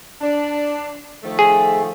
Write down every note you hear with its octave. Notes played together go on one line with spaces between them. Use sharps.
D4
D#3 F3 A3
G#4